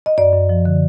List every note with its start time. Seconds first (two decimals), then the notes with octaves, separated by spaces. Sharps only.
0.06 D#5
0.18 F#2 D5
0.33 F#2
0.49 F3
0.66 D3